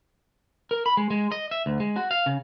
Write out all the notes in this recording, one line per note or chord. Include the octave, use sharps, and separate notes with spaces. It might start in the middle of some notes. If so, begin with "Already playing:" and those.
A#4
B5
G#3
G#3
D#5
E5
D2
G#3
F#4
F5
C#3